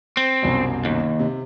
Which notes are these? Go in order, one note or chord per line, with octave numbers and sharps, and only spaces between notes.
C4
C2 F#2 B2
D#2
C3